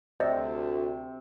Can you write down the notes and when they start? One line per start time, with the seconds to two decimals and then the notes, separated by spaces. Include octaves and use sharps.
0.20 D2 C3 C4 C5 D5 D#5